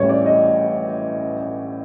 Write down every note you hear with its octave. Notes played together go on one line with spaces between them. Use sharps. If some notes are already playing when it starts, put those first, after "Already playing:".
Already playing: A1 A2 E3 G3 C#5
D5
D#5